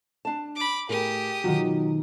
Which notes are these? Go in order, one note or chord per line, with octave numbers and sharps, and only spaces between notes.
D4 A5
B5 D6
A2 G4 G#4 A#4 D#6
B2 D#3 F#3 F4 F#4